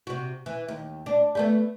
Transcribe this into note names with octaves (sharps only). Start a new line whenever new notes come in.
C3 F#4
E3
D#2
D4
G3 A3 B3